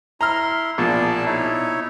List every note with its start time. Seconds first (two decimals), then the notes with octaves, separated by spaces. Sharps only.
0.21 E4 A#5 C6 F6
0.78 A#1 B2 G#4 D5 A5
1.26 D#4 E4 C#5